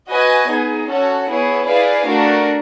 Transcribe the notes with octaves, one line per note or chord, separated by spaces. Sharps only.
F#4 B4 D#5 G#5
B3 D#4 G#4
C#4 F#4 A4 C#5 F#5
B3 E4 G#4 C#5
E4 G#4 B4 D5 F5
A3 D4 F#4 A#4